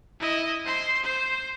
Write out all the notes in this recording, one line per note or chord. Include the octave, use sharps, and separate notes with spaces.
E4 D#5
C5 C6
C5